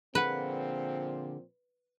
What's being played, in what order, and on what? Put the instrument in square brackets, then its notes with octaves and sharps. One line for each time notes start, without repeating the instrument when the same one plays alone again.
[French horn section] A#2 F3 C4 [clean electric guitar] D3 G#4 F#5 [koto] B4